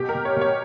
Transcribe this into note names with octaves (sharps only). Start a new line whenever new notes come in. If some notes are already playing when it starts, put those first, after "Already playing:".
Already playing: B2 G4
A#4
B2
C#5
B2 C#5